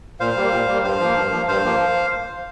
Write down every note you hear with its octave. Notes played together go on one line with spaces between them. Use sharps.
A#2 C5 F5
G3 A#3
A#2
G3 A#3
G2 C5 F5
F3 A#3
G2
F3 A#3
G2 C5 F5
F3 A#3